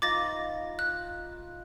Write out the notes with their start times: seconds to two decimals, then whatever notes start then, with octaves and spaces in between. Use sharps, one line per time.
0.02 D#4 F4 B4 D6 A6 A#6
0.79 F#6